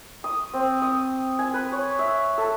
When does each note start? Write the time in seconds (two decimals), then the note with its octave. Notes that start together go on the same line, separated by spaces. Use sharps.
0.24 D#6
0.53 C4
0.82 D#6
1.39 G#5
1.54 B4
1.72 C#5
1.99 E5
2.38 A4